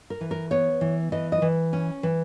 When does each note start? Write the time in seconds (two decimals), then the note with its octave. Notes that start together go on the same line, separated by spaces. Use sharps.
0.10 A#4
0.21 E3
0.31 A#4
0.51 B3 C#5
0.81 E3
1.12 E3 D#5
1.32 D#5
1.42 E3
1.73 C#4
2.03 E3